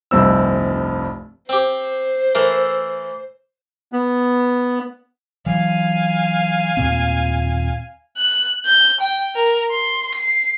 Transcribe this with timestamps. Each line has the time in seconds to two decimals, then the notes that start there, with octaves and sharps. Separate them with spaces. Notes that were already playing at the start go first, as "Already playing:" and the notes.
0.11 F1 C2 G2 C4 E6
1.49 C4 G4 C5
2.35 E3 A3 A#4
3.92 B3
5.46 E3 F#3 F5 G#5
6.77 D#2 A#2 C4
8.17 F#6
8.65 G6
9.00 G5
9.35 A#4
9.70 C6
10.15 C7